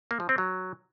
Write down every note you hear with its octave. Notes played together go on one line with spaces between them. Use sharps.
A#3
F3
C4
F#3